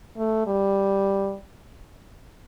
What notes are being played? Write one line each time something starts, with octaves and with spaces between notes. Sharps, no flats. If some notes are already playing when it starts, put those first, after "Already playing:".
A3
G3